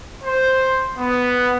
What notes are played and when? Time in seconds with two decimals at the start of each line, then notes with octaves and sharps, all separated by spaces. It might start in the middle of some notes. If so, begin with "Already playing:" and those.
0.24 C5
0.98 B3